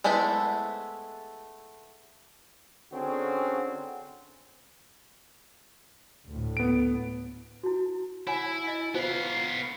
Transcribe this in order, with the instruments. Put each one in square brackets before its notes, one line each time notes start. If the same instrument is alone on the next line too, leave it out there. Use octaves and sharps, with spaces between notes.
[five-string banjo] G#3 A3 B3 E4 C5
[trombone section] D3 C4 C#4 F#4 G#4
[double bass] D2 A2
[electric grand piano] B3 D7
[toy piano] E4 F#4
[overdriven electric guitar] E4 [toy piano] C#5 F#5 G#5
[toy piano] D#5 E5
[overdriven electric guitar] B3 F5 [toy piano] F4 B4 C5